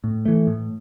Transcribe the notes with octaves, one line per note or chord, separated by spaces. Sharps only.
A2
E3 A3
A2